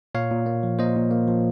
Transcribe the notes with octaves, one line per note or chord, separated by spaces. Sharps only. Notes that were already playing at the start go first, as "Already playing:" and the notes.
A#2 C#5 F5
A#2
A#3
F3
A#2 C5 D#5
A#2
A#3
F3